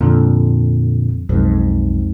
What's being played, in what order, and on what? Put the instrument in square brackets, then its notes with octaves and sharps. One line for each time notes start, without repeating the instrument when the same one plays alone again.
[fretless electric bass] F2 [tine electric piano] A#2 D3
[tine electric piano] B1 [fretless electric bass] F2 G#2